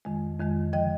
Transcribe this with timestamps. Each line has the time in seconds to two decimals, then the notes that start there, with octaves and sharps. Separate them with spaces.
0.05 F2 D#3 G#3
0.39 F2 D#3 G#3
0.73 D3 F3 D#5 G5